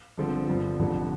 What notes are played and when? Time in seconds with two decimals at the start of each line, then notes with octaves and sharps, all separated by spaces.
0.18 G1 G2 D3 F3 C4
0.47 G1 G2 F3
0.79 F1 F2 D3 G3